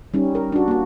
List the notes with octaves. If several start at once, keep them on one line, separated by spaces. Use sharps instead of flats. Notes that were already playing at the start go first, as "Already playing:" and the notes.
G3 C#4 D#4
A#4
D4 F#4
A#3 F#4